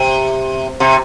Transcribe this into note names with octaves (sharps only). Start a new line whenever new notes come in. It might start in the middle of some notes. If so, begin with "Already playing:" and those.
Already playing: C3
C3